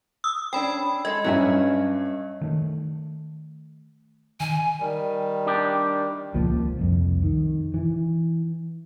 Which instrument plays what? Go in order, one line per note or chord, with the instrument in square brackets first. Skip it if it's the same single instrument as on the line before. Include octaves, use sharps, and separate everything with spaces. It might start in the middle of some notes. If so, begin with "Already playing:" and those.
[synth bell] D#6 E6
[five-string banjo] C#4 D4 [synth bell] G5 B5
[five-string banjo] G#3 A4 [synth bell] D#5
[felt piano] G2 C#4 C#5 [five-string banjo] F#3 E5 G#5
[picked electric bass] D#3 A3
[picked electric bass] D#3 [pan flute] G#5
[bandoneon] D#3 G3
[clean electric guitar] D4 G4
[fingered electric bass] D#1 C#2 F3 A#3
C2 F2
D#3
E3